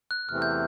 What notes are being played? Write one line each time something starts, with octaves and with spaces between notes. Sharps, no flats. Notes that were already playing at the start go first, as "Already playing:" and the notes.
F#6
E2 C3 E3 A3 C4 F6
G6